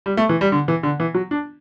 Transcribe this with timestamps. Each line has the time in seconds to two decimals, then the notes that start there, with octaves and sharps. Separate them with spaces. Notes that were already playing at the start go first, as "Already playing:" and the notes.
0.06 G3
0.17 A3
0.29 E3
0.41 G3
0.52 D3
0.68 E3
0.83 D3
1.00 E3
1.14 F#3
1.31 D4